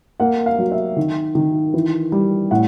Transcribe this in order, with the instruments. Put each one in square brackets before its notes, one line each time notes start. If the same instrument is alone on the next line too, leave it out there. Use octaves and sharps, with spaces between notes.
[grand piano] A#3 F#5
F5
F#3
E5
D#3
D#3
E3
G3
A2 F#5